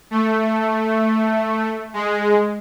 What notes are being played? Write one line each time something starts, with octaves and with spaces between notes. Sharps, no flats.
A3
G#3